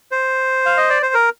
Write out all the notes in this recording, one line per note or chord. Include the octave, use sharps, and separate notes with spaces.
C5
F5
D#5
D5
C5
A#4